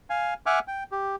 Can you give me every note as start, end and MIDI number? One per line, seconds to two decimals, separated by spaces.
0.10 0.34 77
0.10 0.34 80
0.46 0.59 76
0.46 0.59 78
0.46 0.59 80
0.46 0.59 86
0.46 0.59 89
0.68 0.84 79
0.92 1.16 67